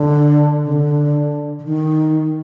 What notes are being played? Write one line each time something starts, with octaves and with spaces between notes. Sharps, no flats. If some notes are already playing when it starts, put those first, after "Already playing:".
Already playing: D3
C#3
D3
D3
D#3